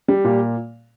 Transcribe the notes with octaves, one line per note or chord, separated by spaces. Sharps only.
G3
A#2